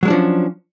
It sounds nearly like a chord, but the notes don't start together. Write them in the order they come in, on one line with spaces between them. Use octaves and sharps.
F#3 G#3 D4 F3 C#4